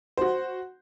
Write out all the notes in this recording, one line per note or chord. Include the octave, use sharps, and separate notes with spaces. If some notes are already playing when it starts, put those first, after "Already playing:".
F#4 C5